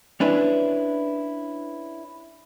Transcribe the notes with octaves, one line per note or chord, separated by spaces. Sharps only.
C#4 D4 E4 B4